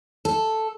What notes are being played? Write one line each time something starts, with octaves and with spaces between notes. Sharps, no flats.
A4